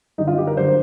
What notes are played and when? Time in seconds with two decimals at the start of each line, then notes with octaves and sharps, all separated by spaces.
0.18 D3 G3 D#4
0.27 F4
0.38 G4
0.47 A#4
0.57 D3 G3 C5